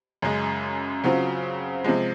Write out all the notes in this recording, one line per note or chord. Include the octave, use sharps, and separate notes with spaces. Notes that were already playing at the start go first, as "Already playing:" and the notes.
F#2 C#3 G#3
C#3 F#3 C4 F4
C3 F3 G#3